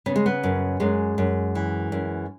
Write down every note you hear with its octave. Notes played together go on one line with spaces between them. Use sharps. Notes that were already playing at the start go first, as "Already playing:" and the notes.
C#3 B3
G#3
B3
F#2
F#2 G#3
F#2
E3
F#2